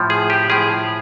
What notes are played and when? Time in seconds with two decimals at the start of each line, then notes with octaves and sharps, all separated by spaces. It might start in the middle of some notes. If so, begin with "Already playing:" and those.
Already playing: A2 F3
0.10 G#4
0.30 G4
0.50 A2 F3 G#4